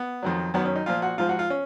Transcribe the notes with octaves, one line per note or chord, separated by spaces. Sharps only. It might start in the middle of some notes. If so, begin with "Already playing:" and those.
Already playing: B3
F2 D#3 F#3
F#2 D#3 F#3 B3
C#4
D#4
A#2 F3 F4
F#4
G#2 F3 F4
F#4
F4
C#4